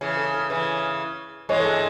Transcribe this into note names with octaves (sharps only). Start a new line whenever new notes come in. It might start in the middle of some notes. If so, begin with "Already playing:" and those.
C#3 E3 G#4
A4
A4
C#3 E3 B4
E3 G#3 C#5
A4
G#4